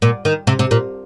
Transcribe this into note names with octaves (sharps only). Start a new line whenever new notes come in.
A#2
D#3
C3
C3
A#2